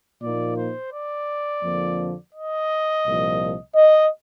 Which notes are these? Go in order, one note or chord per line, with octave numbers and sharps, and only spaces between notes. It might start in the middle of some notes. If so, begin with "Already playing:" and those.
A#2 F3 A#3 D#4 D5
C5
D5
F2 D3 F3 A#3
D#5
C2 A#2 F3
D#5